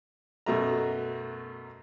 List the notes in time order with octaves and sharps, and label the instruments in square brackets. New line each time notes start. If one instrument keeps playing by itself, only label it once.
[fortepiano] F#2 B2 A3 A#5